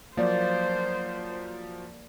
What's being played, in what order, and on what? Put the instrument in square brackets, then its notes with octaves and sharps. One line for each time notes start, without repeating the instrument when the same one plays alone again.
[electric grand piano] F3 F#3 [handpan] A#3 D5 [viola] C5